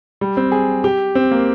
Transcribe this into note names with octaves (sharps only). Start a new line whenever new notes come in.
G3
C4
G#4
G4
C4
A#3